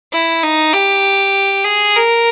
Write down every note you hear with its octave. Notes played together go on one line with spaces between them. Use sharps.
E4
D#4
G4
G#4
A#4